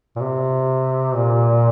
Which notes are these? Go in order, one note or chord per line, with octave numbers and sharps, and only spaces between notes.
A#2
C3
A#2